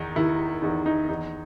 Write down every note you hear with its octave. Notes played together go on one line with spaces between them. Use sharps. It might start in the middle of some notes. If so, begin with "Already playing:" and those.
Already playing: E2 D#3 D#4
D#3 E4
E2 D#4
D#4
E2 D#4